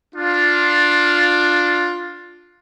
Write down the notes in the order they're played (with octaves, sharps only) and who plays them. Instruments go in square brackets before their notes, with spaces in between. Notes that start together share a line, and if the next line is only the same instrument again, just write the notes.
[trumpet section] D4 F4